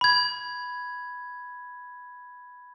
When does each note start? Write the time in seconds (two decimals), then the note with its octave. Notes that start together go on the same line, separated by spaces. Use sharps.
0.01 B5 G#6